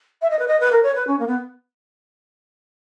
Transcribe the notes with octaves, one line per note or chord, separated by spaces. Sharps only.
E5
D#5
B4
D#5
B4
A#4
C#5
B4
C#4
A#3
B3